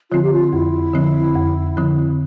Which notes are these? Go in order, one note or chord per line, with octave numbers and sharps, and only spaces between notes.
D3 F3 C4 F4
G4
F4
F2 E4
D3 F3 C4
F2
D3 F3 C4